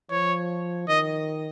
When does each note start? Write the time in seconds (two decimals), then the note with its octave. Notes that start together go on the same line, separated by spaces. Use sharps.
0.10 F3 C#5
0.88 D#3 D#5